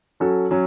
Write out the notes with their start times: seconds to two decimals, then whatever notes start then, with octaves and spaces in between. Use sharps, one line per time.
0.20 F#3 C#4 F#4 A4
0.51 F#3 C#4